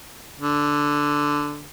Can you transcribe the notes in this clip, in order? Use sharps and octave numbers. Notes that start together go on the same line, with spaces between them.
D3